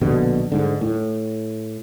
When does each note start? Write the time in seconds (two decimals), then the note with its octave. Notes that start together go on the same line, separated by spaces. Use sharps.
0.01 A#1 B2 D3
0.52 G#2 D3
0.81 A2